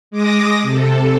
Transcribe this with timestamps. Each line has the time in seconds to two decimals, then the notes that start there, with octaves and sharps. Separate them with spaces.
0.11 G#3 D6 D#6 A#6
0.62 C3 A4